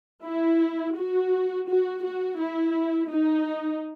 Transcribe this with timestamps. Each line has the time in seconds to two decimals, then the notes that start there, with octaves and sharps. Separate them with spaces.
0.24 E4
0.96 F#4
1.67 F#4
2.04 F#4
2.39 E4
3.10 D#4